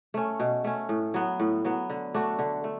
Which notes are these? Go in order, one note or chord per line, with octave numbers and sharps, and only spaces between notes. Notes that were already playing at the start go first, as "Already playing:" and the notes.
A3 C#4
B2
A3 C#4
A2
F#3 B3
A2
F#3 B3
D3
A3 D4 F#4
D3
A3